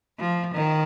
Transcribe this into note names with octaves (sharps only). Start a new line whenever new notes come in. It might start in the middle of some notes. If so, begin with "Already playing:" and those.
F3
D#3